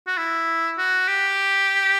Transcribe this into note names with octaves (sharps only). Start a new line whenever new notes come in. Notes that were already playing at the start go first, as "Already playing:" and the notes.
F#4
E4
F#4
G4